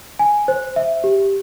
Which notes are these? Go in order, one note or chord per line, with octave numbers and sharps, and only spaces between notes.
G#5
C5
E5
G4